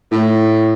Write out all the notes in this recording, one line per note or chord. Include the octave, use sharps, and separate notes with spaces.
A2